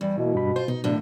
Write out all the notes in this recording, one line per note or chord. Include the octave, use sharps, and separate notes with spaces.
E2 G3
B2 A#3 E4
G2 B5
F4 C5
B2 D#4
D#2 A2 D4